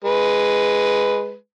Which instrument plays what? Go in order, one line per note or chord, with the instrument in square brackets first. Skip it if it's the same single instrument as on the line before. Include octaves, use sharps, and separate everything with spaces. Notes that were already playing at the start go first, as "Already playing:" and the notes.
[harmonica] G#3 B4